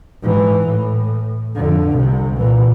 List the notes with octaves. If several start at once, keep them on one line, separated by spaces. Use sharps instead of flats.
G#2 E3
A2
F2 D3
C2 C3
A#2 E3